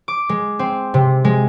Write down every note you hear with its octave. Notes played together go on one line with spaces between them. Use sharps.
D6
G#3
C4
C3
G#3